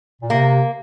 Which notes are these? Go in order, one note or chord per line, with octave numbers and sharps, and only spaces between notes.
A#2
C3 A#3